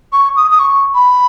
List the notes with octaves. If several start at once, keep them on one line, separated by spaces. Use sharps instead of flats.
C#6
D#6
D#6
C#6
B5